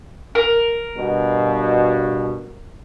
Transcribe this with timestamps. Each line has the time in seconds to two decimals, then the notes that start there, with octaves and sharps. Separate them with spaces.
0.35 A#4
0.96 G2 B2